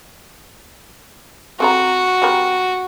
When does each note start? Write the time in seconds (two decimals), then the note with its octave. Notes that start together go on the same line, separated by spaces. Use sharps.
1.60 C4 F#4 A4 A#5
2.22 G3 C4 A#4